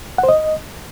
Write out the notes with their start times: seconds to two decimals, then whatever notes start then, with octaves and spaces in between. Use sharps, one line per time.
0.18 F#5
0.23 C5
0.29 D#5